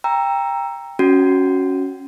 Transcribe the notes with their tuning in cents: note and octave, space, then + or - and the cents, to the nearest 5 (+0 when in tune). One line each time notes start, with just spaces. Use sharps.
G5 +20 A#5 +0 E6 +15
C#4 +0 F#4 +0